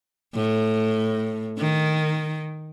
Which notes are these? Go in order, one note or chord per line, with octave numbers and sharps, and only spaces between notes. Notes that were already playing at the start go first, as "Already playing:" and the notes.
A2
D#3